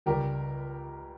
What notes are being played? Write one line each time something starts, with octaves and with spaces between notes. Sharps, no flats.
C#2 C#3 G3 G4 A#4